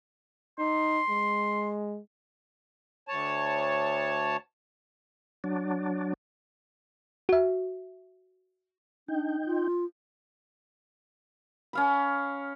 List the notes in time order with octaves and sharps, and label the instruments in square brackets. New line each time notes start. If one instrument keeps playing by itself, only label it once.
[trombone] D#4 [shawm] C6
[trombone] G#3
[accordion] D2 C#5 A5
[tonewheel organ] F#3 D4
[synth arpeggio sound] F#4 E5
[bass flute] D4 [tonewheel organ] D#4 G5
[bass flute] F4
[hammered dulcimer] C#4 F5 B5